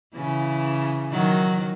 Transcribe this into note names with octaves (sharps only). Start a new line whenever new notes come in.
C#3 E3
D#3 F#3